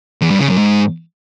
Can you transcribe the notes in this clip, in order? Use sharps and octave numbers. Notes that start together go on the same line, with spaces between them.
E2
G2
C#3
F#2
G#2